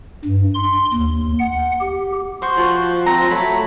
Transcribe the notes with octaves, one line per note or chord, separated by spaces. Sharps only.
G2
C6
D#2
F#5
G4
F#4 C5 C6 C#6
F3
C4 A#5
F#3 A3 B5